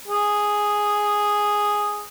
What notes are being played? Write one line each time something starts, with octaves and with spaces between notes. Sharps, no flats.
G#4